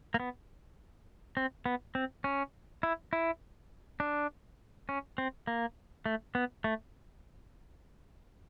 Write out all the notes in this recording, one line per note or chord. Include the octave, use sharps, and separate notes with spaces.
A#3
B3
C4
B3
C4
C#4
E4
E4
D4
C#4
C4
A#3
A3
B3
A3